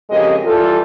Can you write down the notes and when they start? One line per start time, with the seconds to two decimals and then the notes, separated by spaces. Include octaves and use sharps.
0.10 F2 C#3 G#3 G4 A#4 D#5
0.44 E3 G3 F4 A4